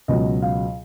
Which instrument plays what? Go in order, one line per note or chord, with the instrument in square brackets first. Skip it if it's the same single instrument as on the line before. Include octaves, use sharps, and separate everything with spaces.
[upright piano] C#2 B2 F#3 D#5
F5